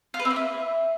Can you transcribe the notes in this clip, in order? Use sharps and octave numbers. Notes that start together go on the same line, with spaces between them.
F4
B4
C4
A#3
E4